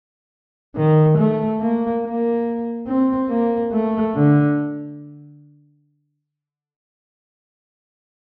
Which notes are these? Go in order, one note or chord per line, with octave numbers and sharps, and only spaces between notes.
D#3
A3
A#3
A#3
C4
A#3
A3
D3